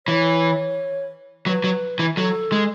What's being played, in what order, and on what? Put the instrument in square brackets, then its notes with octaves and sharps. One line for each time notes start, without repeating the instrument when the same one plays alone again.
[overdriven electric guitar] E3 [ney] C#5
[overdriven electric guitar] F#3 [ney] B4
[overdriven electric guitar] F#3
E3
[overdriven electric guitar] F#3 [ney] A4
[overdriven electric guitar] G#3